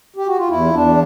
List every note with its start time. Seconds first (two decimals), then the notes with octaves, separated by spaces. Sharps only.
0.16 G4
0.26 F#4
0.38 F4
0.49 E2 E4
0.73 E2 D4